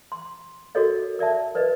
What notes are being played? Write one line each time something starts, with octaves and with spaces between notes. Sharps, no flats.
C6
F#4 G4 A4 A#4 C#5 D#5
A#4 D5 E5 A5
A#4 B4 D5 D#5